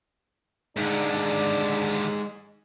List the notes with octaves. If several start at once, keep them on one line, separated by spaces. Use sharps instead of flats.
D#2 D3 G#3 D4 D#4